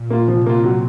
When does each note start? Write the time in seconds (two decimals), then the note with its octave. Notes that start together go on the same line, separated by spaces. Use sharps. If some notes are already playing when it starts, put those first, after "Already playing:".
Already playing: A#2
0.10 A#3 F4
0.28 C3 F3
0.46 A#3 F4
0.63 F#3